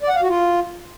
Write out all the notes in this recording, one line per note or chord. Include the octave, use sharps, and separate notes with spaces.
D5
F#5
F5
F#4
F4